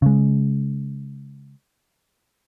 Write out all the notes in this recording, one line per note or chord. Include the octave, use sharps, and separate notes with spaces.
C#3 G#3